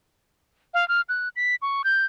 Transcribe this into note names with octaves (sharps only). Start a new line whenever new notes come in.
F5
F6
F#6
B6
C#6
G6